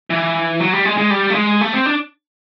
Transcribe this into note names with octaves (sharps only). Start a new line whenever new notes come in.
E3
F#3
G3
G#3
G#3
G3
A3
G#3
A3
C4
D4